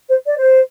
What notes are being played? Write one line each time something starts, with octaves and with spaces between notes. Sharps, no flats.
C5
D5
C5